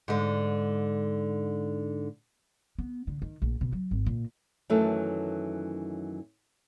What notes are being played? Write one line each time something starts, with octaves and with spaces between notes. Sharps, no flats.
G#2 D3
B3
D3
D#3
A#1
B2
F#3
G#1
A#2
F#2 D#3 E3 F#3 A3 A4